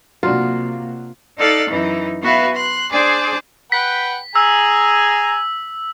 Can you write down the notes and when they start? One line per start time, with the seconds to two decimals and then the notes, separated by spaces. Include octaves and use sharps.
0.23 C3 F#3 A#3 D4 F4 F#4
1.37 D#4 A4 D5 F5 F#6 A6
1.70 F#2 E3 D#4
2.22 B3 F#4 B4 E5 F5
2.54 C6 F#6
2.92 D4 G#4 C5 D5 G#5
3.72 B4 F#5 G5 B6
4.35 G#4 G#5 A#5 E6